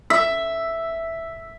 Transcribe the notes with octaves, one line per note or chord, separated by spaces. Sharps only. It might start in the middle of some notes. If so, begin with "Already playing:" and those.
E5